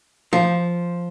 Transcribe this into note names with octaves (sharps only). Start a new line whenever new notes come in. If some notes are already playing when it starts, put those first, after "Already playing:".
F3